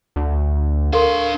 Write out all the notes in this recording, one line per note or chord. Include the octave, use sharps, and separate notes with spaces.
D2
D4 A4 A#4 F5 C6